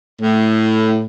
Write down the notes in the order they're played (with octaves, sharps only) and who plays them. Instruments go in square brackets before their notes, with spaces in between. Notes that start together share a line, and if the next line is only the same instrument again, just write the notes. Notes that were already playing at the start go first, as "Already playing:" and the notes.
[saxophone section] A2